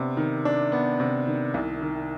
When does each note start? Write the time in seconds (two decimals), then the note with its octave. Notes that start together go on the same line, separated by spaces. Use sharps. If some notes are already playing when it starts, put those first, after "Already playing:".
Already playing: C3 B3 D4
0.17 D#3
0.45 D4
0.72 B3
1.00 C3
1.27 D#3
1.54 C2
1.81 D#3